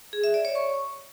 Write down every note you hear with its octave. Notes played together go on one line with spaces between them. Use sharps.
G#4
E5
D5
C#5
C#6